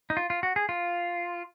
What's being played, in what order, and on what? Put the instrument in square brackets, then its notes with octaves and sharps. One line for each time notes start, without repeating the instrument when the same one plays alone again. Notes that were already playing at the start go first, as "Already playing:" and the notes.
[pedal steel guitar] D#4
F4
F4
F#4
G#4
F4